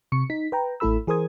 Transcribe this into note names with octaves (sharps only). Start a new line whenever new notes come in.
C3 C#6 C#7
D#4 B6
B4 G5 A#5
A1 A3 E4 A4 B5 E6
E3 G#4 A#4 C5 D#6 G#6